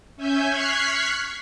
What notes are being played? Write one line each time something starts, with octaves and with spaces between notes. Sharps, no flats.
C#4 E5 G#5 G6
C#6 F6 F#6 G#6 B6 C7